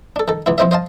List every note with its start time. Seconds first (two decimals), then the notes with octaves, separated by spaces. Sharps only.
0.16 D4 A4
0.28 D#3 A4
0.46 C#2 E3 E4
0.58 F3 C4 E4 C5 D#5 E5
0.71 C5 D#5 F5 A5